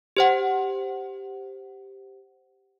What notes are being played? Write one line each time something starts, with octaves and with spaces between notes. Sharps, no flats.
G4 C5 F#5